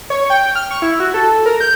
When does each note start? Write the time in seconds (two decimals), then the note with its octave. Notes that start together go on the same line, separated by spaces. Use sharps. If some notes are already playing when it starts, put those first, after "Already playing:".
0.10 C#5
0.30 G5
0.55 F6
0.71 C#6
0.82 E4
1.00 F#4
1.14 A4
1.46 A#4
1.60 G6